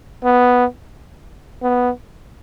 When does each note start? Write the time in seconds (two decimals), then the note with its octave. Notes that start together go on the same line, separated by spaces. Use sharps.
0.24 B3
1.62 B3